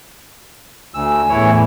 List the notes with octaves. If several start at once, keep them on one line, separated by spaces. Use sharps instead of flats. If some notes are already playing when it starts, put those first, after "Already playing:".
D2 G#5 E6
E2 A2 E3 E4 C#5